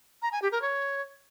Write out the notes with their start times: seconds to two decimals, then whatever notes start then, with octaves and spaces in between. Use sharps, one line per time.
0.22 A#5
0.32 G#5
0.42 G4
0.52 A#4
0.62 C#5